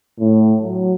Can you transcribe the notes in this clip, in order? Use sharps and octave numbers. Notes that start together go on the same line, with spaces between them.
A2
F#3